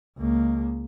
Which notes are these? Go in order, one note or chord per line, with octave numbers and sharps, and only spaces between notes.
C#2 A#3